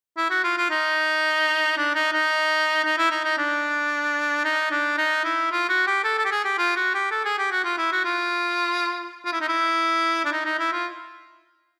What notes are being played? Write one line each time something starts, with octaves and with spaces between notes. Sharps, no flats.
E4
F#4
F4
F4
D#4
D4
D#4
D#4
D#4
E4
D#4
D#4
D4
D#4
D4
D#4
E4
F4
F#4
G4
A4
A4
G4
G#4
G4
F4
F#4
G4
A4
G#4
G4
F#4
F4
E4
F#4
F4
F4
E4
D#4
E4
D4
D#4
D#4
E4
F4